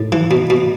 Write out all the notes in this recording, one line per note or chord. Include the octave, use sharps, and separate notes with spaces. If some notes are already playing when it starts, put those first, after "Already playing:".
Already playing: A2
E3
B2
B2